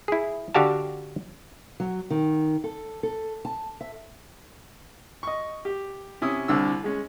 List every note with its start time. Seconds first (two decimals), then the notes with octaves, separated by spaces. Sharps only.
0.08 E4 G#4
0.54 D3 F#4 G4 F5 A5
1.80 F#3
2.10 D#3
2.64 A4
3.03 A4
3.45 A5
3.81 E5
5.23 D#5 C#6
5.65 G4
6.21 C3 C#4 E4 D#6
6.48 C2 D3 E6
6.84 G#3 C#4